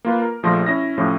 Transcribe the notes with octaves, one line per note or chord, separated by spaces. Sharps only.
A#3 F4 B4
A#4
A#1 F3 A3 C6 A#6
C#4 E4 A#6
A2 C3 F3 C#4